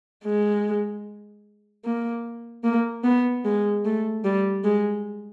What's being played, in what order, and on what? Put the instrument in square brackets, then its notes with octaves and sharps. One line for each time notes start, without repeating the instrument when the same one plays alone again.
[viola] G#3
A#3
A#3
B3
G#3
A3
G3
G#3